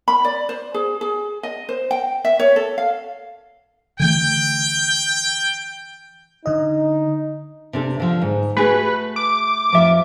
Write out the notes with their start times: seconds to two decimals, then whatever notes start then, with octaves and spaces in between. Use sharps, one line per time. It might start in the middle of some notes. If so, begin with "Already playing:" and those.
0.08 B5
0.25 D5
0.49 C5
0.74 G#4
1.01 G#4
1.43 D#5
1.69 C5
1.91 G5
2.25 E5
2.40 C#5
2.56 A4
2.78 F5
3.99 D3 E3 A3 G5
6.46 D3 D#4 D#5
7.73 C3 D4 A4
8.00 D3 F3
8.22 G#2
8.57 A3 F#4 G#4 B4
9.16 D6
9.72 F2 F3 E5